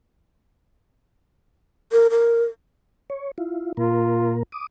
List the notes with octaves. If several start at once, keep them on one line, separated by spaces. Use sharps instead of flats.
A#4
A#4
C#5
E4 F4
A#2 A#3 F4 A#4
D6 D#6